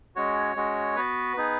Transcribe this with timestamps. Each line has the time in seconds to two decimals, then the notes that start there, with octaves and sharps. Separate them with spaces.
0.16 G#3 C#4 F#4 C#5
0.56 G#3 C#4 F#4
0.96 B3 F#4 B4
1.37 B3 D#4 G#4